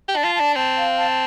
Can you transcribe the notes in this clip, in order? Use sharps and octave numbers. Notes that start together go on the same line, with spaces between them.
G4
D4 A5
F4
D4 A5
C4 A5
F5
A5